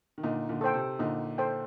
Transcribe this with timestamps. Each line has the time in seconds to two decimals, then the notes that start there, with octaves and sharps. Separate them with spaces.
0.18 D#3
0.23 A#2 D3 D#4
0.49 A#2 D3
0.61 A4 C5 G5
0.74 C3
0.99 A#2 D3 D#4
1.38 A4 C5 G5